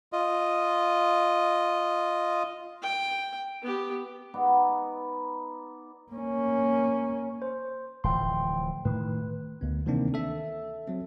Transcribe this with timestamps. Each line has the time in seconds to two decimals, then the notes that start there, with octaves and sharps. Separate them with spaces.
0.13 F4 D#5
2.82 G5
3.62 B3 G4
4.34 B3 D#4 D5
6.12 A#3 C#4
7.42 C5
8.04 D1 E3 F3 G5 C6
8.85 A2 D#3 B4
9.61 D2 B3
9.86 C3 D#3 E3 A#3 C4 D4
10.14 A4 E5
10.87 F#3 C4